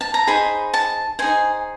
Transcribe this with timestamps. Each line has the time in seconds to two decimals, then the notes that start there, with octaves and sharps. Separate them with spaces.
0.01 A5
0.14 A#5
0.27 D#4 G#4 C5 B5
0.74 A5
1.19 D#4 G#4 C5 G#5